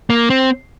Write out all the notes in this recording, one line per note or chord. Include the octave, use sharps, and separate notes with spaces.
A#3
C4